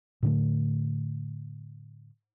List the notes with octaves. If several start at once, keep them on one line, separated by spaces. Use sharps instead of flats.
A2 D3 A3